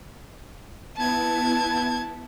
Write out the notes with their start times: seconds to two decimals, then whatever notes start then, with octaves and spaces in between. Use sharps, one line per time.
0.96 B3 E4 A5 G#6